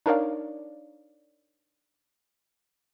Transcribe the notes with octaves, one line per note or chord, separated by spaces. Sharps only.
D4 D#4 A#4 C#5 D5 F5